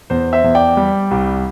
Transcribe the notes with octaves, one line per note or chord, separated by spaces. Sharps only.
E2 C5
C5 E5
E2
D5 G5
G3
C2